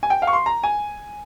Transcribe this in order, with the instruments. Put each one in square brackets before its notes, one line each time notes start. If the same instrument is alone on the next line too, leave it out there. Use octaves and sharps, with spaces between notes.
[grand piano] G#5
G5
F5
C#6
C6
A#5
G#5